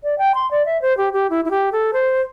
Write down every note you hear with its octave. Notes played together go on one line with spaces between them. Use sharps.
D5
G5
C6
D5
E5
C5
G4
G4
E4
E4
G4
A4
C5